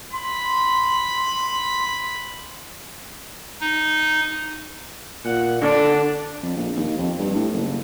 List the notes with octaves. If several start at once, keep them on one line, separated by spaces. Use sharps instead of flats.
B5 C6
D#4
A#2 F#5
D3 D4
F2
A#1
D#2
F2
G2
A2
F#1